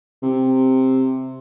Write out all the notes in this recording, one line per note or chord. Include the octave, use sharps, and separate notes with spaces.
C3